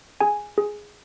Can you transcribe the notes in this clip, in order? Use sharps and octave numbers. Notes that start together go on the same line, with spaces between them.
G#4 G#5
G#4